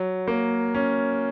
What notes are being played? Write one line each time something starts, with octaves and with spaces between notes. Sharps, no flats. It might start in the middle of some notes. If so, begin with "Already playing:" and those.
Already playing: F#3
A#3
C#4